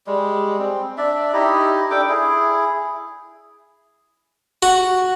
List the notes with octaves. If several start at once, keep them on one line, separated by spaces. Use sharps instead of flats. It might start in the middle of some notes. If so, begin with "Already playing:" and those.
G3 G#3
C4
D4 D5 E5
D#4 E4 G4 D#5
D4 A4 G5 D6
E4 G#4
F#4